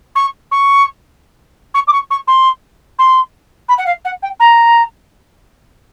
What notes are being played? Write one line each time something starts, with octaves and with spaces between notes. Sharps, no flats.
C#6
C#6
C#6
D6
C#6
C#6
C6
C6
B5
F#5
F5
F#5
G5
A#5